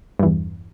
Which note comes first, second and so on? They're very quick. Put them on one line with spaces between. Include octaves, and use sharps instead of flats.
G2 E3 E2